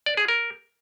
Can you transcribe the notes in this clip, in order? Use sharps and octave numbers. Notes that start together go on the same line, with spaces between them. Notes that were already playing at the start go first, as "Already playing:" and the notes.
D5
G#4
A#4